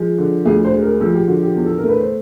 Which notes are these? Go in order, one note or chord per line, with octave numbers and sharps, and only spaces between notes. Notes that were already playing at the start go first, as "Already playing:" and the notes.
Already playing: F3 G#3
D3
D2 G#4
C5
G#3
A#4
F3 A4
G4
D3 F#4
G4
E2
A4
A#4
A3
B4
C5